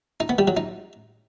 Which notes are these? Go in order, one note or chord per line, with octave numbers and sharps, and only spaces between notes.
D#4
B3
G3
F#3
D#4